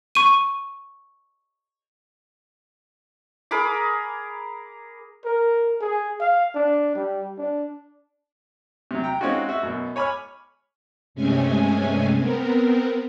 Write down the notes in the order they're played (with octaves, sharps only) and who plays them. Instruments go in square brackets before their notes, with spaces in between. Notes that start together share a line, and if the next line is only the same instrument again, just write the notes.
[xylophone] C#6 D#7
[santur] G#4 A#4 B5 D6
[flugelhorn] A#4
G#4
F5
D4
G3
D4
[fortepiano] C3 F#3
G5 A#5
G#3 C4 C#4 D#4 F4 F#4
F#4 E5
F#2 B2
C#5 G#5 B5 D6 F6
[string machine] G2 C3 G#3 A3 C#4 G#5
B3 C4 A#4